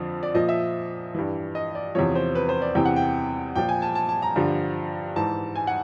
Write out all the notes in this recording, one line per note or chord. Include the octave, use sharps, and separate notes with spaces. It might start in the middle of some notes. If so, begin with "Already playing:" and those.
Already playing: F2 D3 F3
D5
A#2 F3 D#5
E5
G2 E3
D#5
D5
E2 C3 F3 C#5
C5
B4
C5
D5
E2 C3 E3 G5
F#5
G5
A#2 F3 G5
G#5
A5
A5
A5
A#5
G2 D3 F3
G#2 E3 A5
G#5
F#5